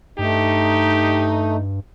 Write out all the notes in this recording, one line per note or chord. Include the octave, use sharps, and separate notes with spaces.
G2 A3 D#4 G4